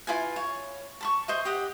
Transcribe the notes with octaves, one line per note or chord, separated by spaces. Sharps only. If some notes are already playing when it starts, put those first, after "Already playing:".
E4 F4 B4 G#5
C#5
A5 B5 C#6
C5 D#5 E5
G4 D#5 F#5